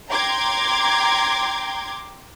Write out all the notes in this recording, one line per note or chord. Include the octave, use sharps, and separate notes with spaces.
G5 A#5 C6 D6 G#6